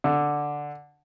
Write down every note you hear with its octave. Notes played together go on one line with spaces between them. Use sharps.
D3